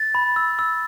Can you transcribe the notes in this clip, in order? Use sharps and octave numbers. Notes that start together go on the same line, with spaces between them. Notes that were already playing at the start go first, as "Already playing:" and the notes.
Already playing: A6
B5
E6
E6